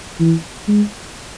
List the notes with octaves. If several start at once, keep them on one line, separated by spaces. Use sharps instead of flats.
E3
G#3